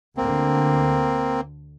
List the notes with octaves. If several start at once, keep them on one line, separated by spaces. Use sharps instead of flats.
D2 D3 A#3 C4